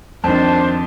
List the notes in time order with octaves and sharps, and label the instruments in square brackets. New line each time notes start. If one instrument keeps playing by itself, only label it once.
[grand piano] F2 D#3 [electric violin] D4 [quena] C5 [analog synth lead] A5